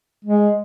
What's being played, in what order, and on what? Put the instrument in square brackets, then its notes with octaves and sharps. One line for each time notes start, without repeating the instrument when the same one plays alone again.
[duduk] G#3